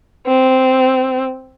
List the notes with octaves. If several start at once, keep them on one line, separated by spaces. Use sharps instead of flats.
C4